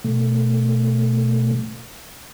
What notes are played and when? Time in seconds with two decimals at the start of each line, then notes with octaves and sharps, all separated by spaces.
0.04 B2 A3